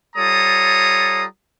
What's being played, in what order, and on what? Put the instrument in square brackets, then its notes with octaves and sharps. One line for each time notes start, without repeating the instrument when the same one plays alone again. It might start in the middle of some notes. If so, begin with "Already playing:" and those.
[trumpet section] G3 F4 A4 C#5 A#5 D#6